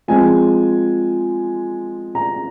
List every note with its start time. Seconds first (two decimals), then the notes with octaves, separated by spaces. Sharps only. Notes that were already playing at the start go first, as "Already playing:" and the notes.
0.08 F3 G#3 C4 G#5
2.15 A#5